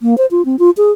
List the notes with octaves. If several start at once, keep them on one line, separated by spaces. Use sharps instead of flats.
A#3
C5
F4
C4
F4
G#4